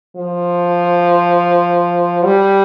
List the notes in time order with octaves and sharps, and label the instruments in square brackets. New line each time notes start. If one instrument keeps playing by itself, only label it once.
[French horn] F3
G3